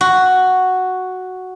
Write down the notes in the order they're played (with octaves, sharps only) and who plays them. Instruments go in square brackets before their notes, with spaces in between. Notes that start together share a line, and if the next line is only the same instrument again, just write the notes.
[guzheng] F#4